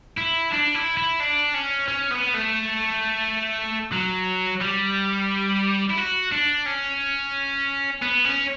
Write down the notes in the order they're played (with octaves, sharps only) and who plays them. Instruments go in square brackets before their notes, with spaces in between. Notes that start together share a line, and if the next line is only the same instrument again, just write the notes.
[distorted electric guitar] E4
D4
E4
E4
D4
C#4
C#4
B3
A3
F#3
G3
E4
F#4
D4
C#4
B3
C#4